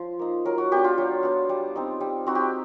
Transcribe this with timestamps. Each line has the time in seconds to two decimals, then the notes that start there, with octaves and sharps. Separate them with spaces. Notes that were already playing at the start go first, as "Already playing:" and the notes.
Already playing: F3 C5
0.19 A#3 D#4
0.45 F#3 A#4
0.58 F#4
0.72 B3 D4 G4
0.84 F4
0.98 F#3
1.23 B3 D4
1.49 G3
1.76 C4 D#4
2.00 G3
2.26 C4 D#4 F#4
2.35 G4